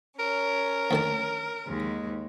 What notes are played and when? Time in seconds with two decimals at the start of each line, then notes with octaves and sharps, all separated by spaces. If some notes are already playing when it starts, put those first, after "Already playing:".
0.19 C#4 A#4
0.91 D2 D#3 A5
1.66 D#2 G#3